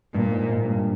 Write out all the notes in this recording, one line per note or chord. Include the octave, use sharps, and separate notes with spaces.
G2 A#2
G#2
G#2
G2